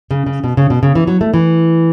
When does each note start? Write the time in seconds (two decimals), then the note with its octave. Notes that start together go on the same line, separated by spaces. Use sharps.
0.11 C#3
0.26 C#3
0.44 B2
0.57 C#3
0.70 B2
0.83 C#3
0.95 E3
1.07 F#3
1.21 A3
1.34 E3